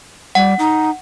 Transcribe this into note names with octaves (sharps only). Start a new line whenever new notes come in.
G3 F#5
D#4